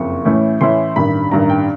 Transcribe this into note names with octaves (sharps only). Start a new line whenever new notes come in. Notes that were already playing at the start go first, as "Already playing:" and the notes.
Already playing: F#1 F2 C#6
A2 E3 A3 C#4 E4
A2 E3 A3 C#4 E4 C6
A1 G2 D#3 B5
A1 G2 D#3 A#5
G5